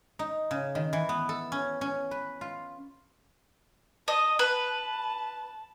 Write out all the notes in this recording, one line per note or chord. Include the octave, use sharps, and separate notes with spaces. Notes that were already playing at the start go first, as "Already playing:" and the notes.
D#4
C#3
D#3
E3
B3
A4
C#4
C#4
B4
F4
D#5 A5 D#6
B4 A5